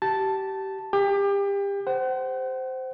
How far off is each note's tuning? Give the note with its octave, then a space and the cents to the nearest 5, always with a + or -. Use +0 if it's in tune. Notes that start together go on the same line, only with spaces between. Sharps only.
G4 -25 A5 +0
G4 +30 G5 +30
C5 -10 F#5 +35